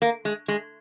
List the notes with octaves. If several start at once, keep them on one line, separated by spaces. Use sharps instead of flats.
A#3
G#3
G#3